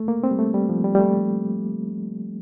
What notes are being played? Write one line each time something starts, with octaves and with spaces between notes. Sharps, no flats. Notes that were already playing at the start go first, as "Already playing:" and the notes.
Already playing: A3
A#3
C4
G3
A3
G3
F3
G3
G3
A3